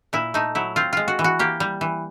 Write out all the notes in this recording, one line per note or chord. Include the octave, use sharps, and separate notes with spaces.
A#2 E4
A3 D#4
F#3 E4
C4 F4
G#3 F4
F#4
E3
F#4
A#3 G4
G3
E3